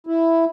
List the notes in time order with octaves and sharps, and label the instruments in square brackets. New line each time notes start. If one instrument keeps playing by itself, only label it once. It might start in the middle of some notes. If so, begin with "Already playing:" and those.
[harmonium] E4